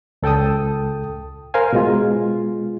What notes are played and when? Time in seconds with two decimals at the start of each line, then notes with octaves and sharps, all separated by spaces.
0.23 C#2 A4 G5 A5 D#6
1.54 A#4 C5 F5 G#5
1.73 B2 G#3 F4